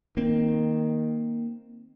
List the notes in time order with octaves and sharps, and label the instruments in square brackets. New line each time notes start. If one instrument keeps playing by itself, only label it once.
[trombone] D#3 [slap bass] A#3 C4